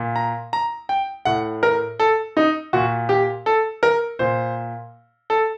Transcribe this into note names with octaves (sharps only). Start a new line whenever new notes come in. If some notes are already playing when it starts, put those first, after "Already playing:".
Already playing: A#2
A#5
A#5
G5
A2 F#5
A#4
A4
D#4
A#2 F#4
G4
A4
A#4
A#2 C5
A4